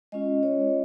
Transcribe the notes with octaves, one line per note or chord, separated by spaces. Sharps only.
G#3 C#4 F4 D#5
C#5